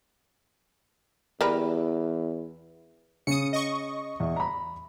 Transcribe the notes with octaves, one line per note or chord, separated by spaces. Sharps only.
E2 G3 A#4 B4
C#3 D#6 C#7
D#5 C#6
E2
A#5 B5